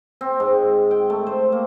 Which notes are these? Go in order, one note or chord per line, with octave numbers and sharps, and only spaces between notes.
C4
G#2
G5
A3
C5
A#3